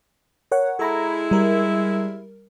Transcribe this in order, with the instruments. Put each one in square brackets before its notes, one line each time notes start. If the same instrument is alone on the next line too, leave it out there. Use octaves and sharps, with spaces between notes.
[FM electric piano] A#4 C#5 F#5
[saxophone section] G#3 E4 [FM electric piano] A4 A#5 B5
[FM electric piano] G3 A#4